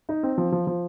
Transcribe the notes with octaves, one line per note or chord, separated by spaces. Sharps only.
D#4
C4
F3
F3
F3